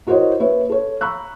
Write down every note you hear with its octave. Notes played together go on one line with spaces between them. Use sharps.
E4 F#4 A#4 C5 C#5 D#5
A#3 B4 C#5 E5
A4 C#5
A#5 B5 C#6 E6 F#6